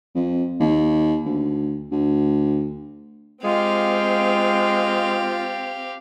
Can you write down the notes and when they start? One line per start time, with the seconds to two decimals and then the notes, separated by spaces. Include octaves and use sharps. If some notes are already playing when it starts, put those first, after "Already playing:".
0.15 F2
0.60 D#2
1.26 D2
1.92 D2
3.44 G#3 C4 F4 G4 F5